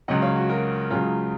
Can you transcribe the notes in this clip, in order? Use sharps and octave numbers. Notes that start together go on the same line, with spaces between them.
C#2 C#3 F#3 D#5 F#5
C#5 F5
F#4
F#4 A#4
C#2 C#3 F#3 F4 G#4